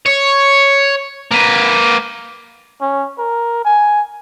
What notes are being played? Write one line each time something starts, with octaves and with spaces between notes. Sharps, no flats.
C#5
A#3 B4
C#4
A#4
G#5